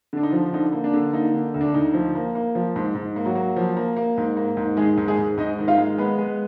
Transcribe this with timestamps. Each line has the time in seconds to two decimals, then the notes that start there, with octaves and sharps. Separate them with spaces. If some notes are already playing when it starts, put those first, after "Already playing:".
0.13 D3 D4
0.23 D#4
0.32 F3
0.53 D3 D#4
0.73 A#3
0.84 D4
0.94 D3
1.13 A#3 D#4
1.34 D3
1.54 D2
1.61 D4
1.74 D2 D#4
1.94 F3
2.15 A#3
2.35 A#3
2.55 F3
2.76 G#2
2.95 G#2
3.16 A#3
3.25 F#3 F#4
3.35 A#3
3.57 F3
3.77 A#3
3.97 A#3
4.17 G#2
4.37 A#3
4.57 G#2
4.77 D#3 G#3 G#4
4.97 G#2
5.08 G#3 G#4
5.18 G#2
5.37 G#2 D#4 D#5
5.59 D#3
5.68 F4 F5
5.78 G#3
5.98 G#3 B3 B4
6.19 G#3